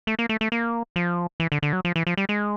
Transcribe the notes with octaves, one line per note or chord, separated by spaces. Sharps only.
A3
A#3
A3
A3
A#3
F3
E3
D3
D3
F#3
F3
E3
F3
G3
G#3